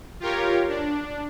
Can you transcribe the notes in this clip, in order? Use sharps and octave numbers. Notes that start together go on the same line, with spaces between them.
F4 G4 A#4 C#5
D4